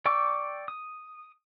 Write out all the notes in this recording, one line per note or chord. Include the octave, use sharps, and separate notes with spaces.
D5 G5 C#6 D6 E6
D#6